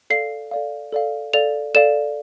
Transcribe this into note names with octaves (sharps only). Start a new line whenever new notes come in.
A4 D5 F5 C7
A4 D5 F5
A4 D5 F5
A4 D5 F5 F7
A4 D5 F5 E7